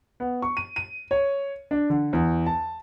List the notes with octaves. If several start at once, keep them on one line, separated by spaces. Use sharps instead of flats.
B3
C#6
D#7
D#7
C#5
D4
D3
E2
A5